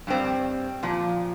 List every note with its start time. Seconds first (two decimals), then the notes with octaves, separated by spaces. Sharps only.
0.07 G2 G3 C4
0.83 A#2 F3